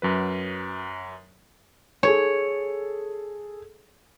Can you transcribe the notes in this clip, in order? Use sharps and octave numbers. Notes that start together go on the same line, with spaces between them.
F#2 F#3 B4
G#4 A4 C#5